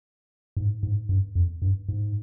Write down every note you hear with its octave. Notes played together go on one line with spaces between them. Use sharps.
G#2
G#2
G2
F2
G2
G#2